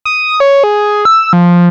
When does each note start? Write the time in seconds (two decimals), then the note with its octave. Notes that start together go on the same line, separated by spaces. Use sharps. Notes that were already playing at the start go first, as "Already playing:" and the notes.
0.05 D#6
0.40 C#5
0.64 G#4
1.05 E6
1.33 F3